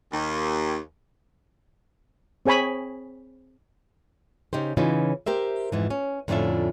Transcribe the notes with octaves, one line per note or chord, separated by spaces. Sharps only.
D#2
C4 G#4 C#5 G#5 B5
C#3 D#4 G4 C5
C#3 E3 C#4 D#4 F4
G4 A#4 C5 E5
F2 G#2 E3
C#4
F2 A2 D3 C#4 F4 E5